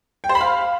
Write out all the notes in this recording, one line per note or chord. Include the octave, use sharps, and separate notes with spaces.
G5
C5
B5
F5